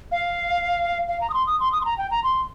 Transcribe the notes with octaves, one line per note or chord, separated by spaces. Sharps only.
F5
F5
A#5
D#6
C6
D#6
C6
D#6
C6
A#5
G5
A#5
C6